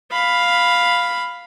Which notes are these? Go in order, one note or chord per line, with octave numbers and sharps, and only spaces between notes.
F5 B5